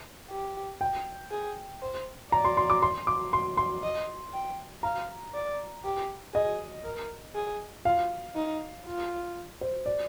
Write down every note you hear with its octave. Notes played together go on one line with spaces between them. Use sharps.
G4
G5
G#4
C5
D5 A#5
C6
C6
D6
C6
D6
C6
C6
D#5
G5
F5 A#5
D5
G4
G#4 D#5
A#4
G#4
F4 F5
D#4
F4
C5
D5